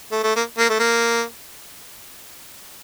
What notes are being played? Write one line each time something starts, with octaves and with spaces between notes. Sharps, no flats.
A3
A3
A#3
A#3
A3
A#3